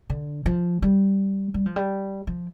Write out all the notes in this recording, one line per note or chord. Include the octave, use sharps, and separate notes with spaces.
D3
F3
G3
G3
F3
G3
F3